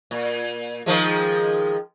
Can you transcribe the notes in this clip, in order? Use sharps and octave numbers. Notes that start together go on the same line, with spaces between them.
A#2
D#3 F3 G#3